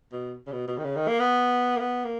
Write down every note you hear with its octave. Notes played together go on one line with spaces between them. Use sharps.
B2
C#3
B2
B2
D#3
C#3
D#3
A#3
B3
A#3
B3
A#3